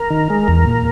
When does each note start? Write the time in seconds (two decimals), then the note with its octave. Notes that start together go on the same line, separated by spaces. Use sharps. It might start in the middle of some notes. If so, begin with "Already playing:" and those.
Already playing: A#4
0.10 D#3
0.30 G#3
0.48 E2
0.67 A#2